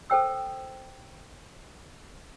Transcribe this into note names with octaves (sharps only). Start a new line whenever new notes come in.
A4 C5 G5 E6